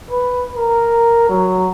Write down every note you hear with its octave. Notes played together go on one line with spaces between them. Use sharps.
B4
A#4
F#3